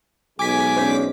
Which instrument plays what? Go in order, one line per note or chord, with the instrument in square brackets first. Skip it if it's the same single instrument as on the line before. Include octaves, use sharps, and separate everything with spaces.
[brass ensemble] B1 G#3 [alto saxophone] G#5 [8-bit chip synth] D6 B6
[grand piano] C#4 D4 C5